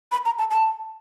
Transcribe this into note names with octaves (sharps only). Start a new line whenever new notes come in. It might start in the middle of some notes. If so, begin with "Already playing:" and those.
B5
A#5
A5
A5